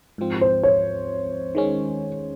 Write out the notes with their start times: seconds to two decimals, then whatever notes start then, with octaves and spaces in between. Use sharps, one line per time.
0.18 G#2 F3 C4
0.41 C5
0.63 C#5
1.55 D#3 G#3 C#4